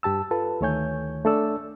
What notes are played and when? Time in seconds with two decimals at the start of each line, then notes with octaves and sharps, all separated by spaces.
0.03 G2 G4 A5 E6
0.31 F4 A4 B4 A5
0.61 D2 D#3 A3 C#5 G#5 G6
1.25 A3 D4 A4 D5 E6